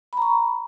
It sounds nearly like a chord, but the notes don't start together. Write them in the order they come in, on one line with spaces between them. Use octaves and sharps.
B5 A#5 C#6